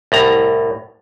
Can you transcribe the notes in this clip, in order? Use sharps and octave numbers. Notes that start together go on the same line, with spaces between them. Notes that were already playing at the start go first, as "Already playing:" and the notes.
C2 A2 A#5